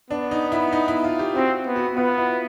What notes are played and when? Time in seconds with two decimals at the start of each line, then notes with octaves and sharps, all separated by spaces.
0.10 B3 D4
0.31 D#4
0.52 E4
0.73 D#4
0.88 E4
1.04 F4
1.19 G4
1.35 C4 F#4
1.67 B3
1.76 F#4
1.96 B3 F4
2.18 E4